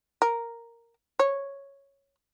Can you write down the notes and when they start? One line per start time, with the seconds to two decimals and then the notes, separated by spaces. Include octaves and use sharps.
0.22 A#4
1.19 C#5